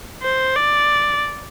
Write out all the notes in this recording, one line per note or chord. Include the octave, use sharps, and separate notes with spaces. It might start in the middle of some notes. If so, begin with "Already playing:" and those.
C5
D5